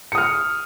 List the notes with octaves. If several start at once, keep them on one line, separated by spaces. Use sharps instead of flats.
D#6 F6 C#7